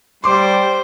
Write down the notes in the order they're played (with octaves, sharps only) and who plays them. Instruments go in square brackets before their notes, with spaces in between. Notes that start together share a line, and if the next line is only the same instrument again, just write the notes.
[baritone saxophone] G3 [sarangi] C5 [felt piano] C6 D6